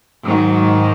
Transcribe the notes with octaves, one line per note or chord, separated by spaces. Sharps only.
G#2 D#3 F#3